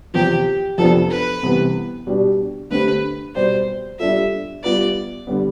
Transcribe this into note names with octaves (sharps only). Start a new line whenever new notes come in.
E2 C3 F3 G4
F2 C3 F3 B3 D4 A4
B4
C2 C3 E3 B3
B2 G3 D4 G4
D3 A3 C4 G4 B4
B2 G3 C4 G4 C5 D5
G3 D4 F4 A4 E5
G3 B3 F4 B4 D5
D3 G3 B3